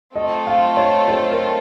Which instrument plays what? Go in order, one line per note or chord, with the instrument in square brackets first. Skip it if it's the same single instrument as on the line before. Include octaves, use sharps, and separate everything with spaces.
[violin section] A3 C4 F4 A4 [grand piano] D#5
[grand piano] F5
C#5
C5
A#4